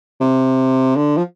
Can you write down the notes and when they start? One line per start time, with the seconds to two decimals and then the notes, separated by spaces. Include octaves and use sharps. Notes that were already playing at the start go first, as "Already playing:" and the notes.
0.20 C3
0.96 D3
1.17 F3